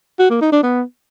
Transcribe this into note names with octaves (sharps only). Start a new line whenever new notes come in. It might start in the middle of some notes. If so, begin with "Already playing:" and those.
F#4
A#3
D#4
D4
B3